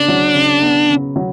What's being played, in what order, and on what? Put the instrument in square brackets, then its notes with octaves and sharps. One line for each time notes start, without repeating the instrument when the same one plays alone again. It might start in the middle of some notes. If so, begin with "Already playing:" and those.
Already playing: [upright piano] C#3 B3 [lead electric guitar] D4
[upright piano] F#3
C#3
B3
C#3
F#3